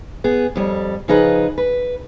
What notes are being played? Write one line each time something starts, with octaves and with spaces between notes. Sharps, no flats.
B3 G#4
F2 G3 C#5
C#3 F3 D#4 G#4 B4
B4